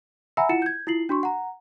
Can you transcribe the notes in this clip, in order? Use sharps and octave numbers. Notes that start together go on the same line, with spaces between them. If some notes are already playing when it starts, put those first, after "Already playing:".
E5 F#5 G#5 A#5 B5 E6
E4 F4 F#5 C#7 E7
G6 G#6
E4 F4 C7 F#7
D4 F#4 C6 C#6
F#5 A#5